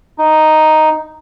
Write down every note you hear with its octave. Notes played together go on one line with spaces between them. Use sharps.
D#4